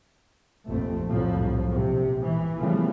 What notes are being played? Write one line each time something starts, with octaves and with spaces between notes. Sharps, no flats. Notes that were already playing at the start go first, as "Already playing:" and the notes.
F1 A#1 F2 A3 C4
C2 F2 A2 F3 F#3
A#1 C3
E3
C#3 E3 F3 G3 A3 B3